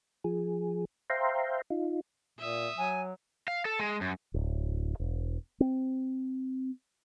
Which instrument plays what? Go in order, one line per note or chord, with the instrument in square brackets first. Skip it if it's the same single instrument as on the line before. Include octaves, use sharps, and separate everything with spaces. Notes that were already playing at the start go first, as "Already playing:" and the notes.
[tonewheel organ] F3 G#4
C5 E5 F5 G5 A#5 C6
D#4 F4
[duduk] A#2 [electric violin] E5 D#6
[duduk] F#3 [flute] G#5
[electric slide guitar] F5
A4
G#3
F#2
[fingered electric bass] D1
E1
C4